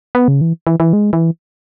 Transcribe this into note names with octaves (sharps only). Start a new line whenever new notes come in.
B3
C#3
E3
E3
E3
G#3
E3